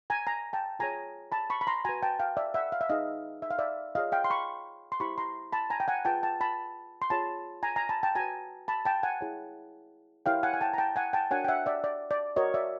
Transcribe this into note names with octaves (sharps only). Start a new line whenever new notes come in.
G#5 A#5
G#5 A#5
G5 A5
F4 G#4 C#5 G#5 A#5
A5 B5
B5 C#6
B5
A#5 C6
F#4 B4 G#5 A#5
G5 A5
F5 G5
D5 E5
E5 F#5
F5
E5
D#4 G#4 B4 D#5 F5
E5
F5
D5 E5
F4 G#4 C#5 D#5 F5
F5 G5
C6
B5 C#6
C6
E4 G4 C5 B5 C#6
A#5 C6
A5 B5
G#5 A#5
G5
F#5 G#5
F4 G#4 B4 G5 A5
G5 A5
A5 B5
C6
F4 G#4 C#5 A5 B5
G#5 A#5
G#5 A#5
A5 B5
G5 A5
F#4 B4 G#5 A#5
A5 B5
G5 A5
F#5 G#5
E4 G#4 C#5
E4 G4 A#4 C#5 F5 G5
F#5 G#5
G#5
G5 A5
A#5
G5 A5
F#5 G#5
G5 A5
D4 F#4 A#4 C#5 F#5 G#5
G5
E5 F#5
D5 E5
D5
D5
F#4 A#4 C#5 D#5
D5 E5